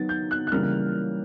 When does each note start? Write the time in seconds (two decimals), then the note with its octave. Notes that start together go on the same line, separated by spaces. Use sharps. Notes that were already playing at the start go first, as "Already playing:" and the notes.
Already playing: D#3 F#3 B3 A6
0.09 G6
0.31 F#6
0.47 F#6
0.51 C#3 E3 G3 A#3 F6